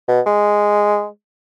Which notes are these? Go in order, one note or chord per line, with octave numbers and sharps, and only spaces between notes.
B2
G#3